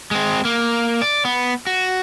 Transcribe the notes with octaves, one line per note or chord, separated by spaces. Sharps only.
G#3 C4
A#3
D5
B3
F#4